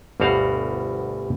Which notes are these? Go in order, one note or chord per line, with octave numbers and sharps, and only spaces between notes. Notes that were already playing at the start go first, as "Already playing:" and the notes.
G1 D2 B2 G3 F#4 F5